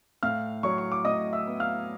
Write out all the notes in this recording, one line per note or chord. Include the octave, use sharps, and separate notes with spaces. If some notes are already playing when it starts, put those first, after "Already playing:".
A2 F5 F6
F#3 C#5 C#6
C#6
D6
A2 D#5 D#6
E5 E6
B3
F5 F6